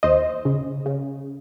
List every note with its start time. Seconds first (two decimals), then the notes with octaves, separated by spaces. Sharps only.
0.03 D#2 C5 D#5
0.45 C#3
0.86 C#3